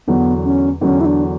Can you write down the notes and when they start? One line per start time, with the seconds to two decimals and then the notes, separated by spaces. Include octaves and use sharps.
0.08 E2 D3 F#3 B3
0.44 C#4
0.81 E2 D3 F#3 C#4
1.01 E4
1.05 D4